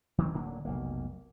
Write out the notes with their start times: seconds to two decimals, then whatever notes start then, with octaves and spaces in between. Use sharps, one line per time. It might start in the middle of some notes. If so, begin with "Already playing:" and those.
0.18 D#3 E3 F#3 C4
0.34 D1 D3 A#3 D4
0.65 F1 B1 A#3